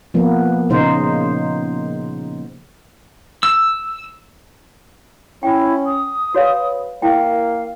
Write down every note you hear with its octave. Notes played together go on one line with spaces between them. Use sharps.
F3 A#3 B3
A#2 C#3 D#4 C5
E6
C#4 E4 G5
D#6
F#4 B4 C#5 F5
A#3 E4 F5 G5